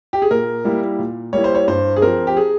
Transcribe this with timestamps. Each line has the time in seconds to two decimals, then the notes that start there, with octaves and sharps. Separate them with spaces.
0.13 G4
0.22 G#4
0.31 A#2 A#4
0.65 G3 A#3 E4
0.99 A#2
1.33 G3 A#3 E4 C#5
1.44 C5
1.55 C#5
1.68 G2 C5
1.96 G#4
2.02 F3 C4 A#4
2.27 G4
2.37 G#4